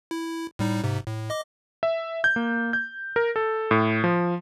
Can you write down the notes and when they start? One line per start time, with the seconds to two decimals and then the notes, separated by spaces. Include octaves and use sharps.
0.11 E4
0.59 A2 G3 D#4
0.84 G#2 C3
1.07 A2
1.30 D#5 D6
1.83 E5
2.24 G6
2.36 A#3
2.73 G6
3.16 A#4
3.36 A4
3.71 A2
4.04 F3